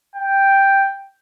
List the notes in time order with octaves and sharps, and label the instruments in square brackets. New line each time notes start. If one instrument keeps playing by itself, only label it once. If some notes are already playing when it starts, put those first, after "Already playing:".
[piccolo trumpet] G5